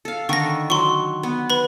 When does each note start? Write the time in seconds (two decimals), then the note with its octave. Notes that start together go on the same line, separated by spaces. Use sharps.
0.05 A4 F5
0.29 D3 D#3 A4 C#6 A#6
0.70 F#3 C6 C#6
1.23 B3
1.50 B4 B5